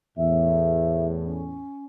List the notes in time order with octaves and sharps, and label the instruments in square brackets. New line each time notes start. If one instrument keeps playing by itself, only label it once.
[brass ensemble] E2 A2 [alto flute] E5
[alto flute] C#4